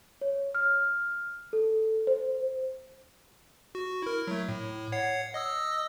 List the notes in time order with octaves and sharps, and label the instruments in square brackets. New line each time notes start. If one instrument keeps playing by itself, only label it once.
[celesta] C#5
F6
A4
C5
[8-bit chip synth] F#4
E4 A#4
F#3 A3
A2
C#5 F#5 C7
D#5 D#6 E6